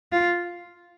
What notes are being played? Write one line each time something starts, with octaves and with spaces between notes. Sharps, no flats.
F4